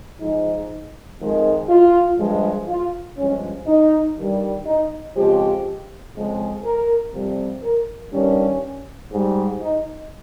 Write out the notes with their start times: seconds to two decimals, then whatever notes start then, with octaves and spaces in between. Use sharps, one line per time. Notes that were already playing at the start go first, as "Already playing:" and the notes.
0.21 G#2 F3 G#3 D#4
1.20 F2 D#3 G#3
1.69 F4
2.18 G2 F3 G#3
2.68 F4
3.17 G2 F3 G#3 C#4
3.66 D#4
4.17 G2 D#3 G3
4.66 D#4
5.15 F2 C#3 F3 G#3 G4
6.15 F2 C#3 G#3
6.64 A#4
7.13 F2 C3 G3
7.63 A#4
8.12 G2 D#3 G3 C#4
9.12 G#2 G3
9.61 D#4